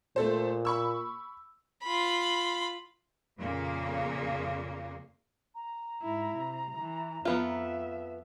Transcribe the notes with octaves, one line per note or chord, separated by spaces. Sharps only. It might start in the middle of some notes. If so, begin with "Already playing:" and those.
A#2 A3 A4 C5
B5 C#6 E6
F4 B5
F2 A#2 C#3 A#3
A#5
G#2 E4
C3
E3
F2 F3 B3 F4 E5